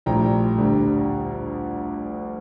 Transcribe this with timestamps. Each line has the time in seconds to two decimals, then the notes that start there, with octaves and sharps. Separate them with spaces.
0.06 A#1 A2 G3 G5 A#5
0.58 D2 D3 G3